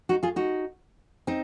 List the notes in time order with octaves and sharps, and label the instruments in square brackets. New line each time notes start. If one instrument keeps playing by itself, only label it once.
[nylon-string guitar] D#4 F#4
F4 G#4
D#4 F#4
C4 D#4